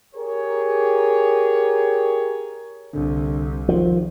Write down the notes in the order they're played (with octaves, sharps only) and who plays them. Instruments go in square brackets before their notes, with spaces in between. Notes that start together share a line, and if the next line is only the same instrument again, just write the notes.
[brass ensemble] G4 G#4 A#4 C#5
[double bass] C2 [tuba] D3
[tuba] D#3 [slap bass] F3